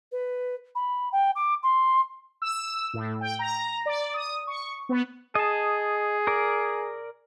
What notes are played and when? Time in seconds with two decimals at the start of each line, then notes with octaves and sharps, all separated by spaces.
0.11 B4
0.75 B5
1.12 G5
1.35 D6
1.63 C6
2.42 E6
2.94 A2
3.21 G5
3.39 A#5
3.86 D5
4.14 D#6
4.47 C#6
4.89 B3
5.35 G#4 D#5 A5
6.27 A#4 D5